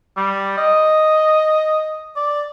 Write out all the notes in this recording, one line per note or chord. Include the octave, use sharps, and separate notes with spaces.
G3
D#5
D5